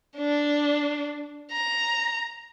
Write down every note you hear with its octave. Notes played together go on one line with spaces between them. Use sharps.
D4
A#5